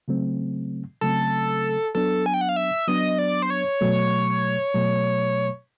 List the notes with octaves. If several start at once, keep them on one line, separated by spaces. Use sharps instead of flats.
C#3 F#3 A3 C4
C#3 F#3 A3 C4 A4
F#3 B3 D4 A4
G#5
G5
F#5
F5
E5
F#3 B3 D4 D#5
D5
C5
C#5
B2 F#3 A3
B2 F#3 A3